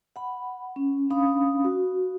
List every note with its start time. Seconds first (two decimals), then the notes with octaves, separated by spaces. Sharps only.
0.16 F#5 B5
0.76 C#4
1.10 C#4 D4 F5 B5 D#6
1.64 F#4